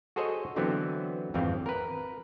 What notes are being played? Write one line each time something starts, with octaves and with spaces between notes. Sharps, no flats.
F#4 G#4 A4 C5 C#5 D#5
D3 E3 F#3 B3 C4
G#1 F2 E3 C4 F5
A#4 B4